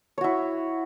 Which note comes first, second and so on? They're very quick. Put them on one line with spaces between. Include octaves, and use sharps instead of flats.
C#5 F#4 E4